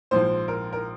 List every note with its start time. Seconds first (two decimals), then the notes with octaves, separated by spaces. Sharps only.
0.11 A#1 G#2 F3 C5
0.48 A#4
0.73 A#4